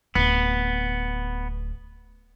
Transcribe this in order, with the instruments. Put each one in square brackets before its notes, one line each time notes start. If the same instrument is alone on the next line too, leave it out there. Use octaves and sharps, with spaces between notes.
[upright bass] D1 [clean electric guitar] B3